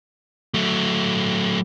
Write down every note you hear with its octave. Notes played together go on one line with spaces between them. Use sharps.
F#3 A3